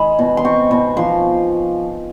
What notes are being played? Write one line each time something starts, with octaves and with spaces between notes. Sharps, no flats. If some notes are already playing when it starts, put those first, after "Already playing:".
Already playing: D#3 G#3 B5
B2
C6
C4 C#6
B2
F3 C6